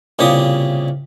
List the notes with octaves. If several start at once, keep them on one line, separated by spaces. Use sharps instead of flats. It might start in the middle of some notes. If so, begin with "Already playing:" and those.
C2 A#2 C#3 G4 D#6